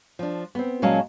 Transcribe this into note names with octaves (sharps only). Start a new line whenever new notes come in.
F3 D4
B3 C4
A#2 F#3 G#3 C#4 F5 A5